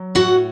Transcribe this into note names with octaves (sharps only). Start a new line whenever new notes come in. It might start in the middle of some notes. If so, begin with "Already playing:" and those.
Already playing: F#3
A2 F#4 F#5